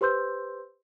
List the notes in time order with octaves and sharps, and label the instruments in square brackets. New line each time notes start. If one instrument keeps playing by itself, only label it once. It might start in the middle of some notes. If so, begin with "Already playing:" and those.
[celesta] G4 B4 C5 C6 E6 G6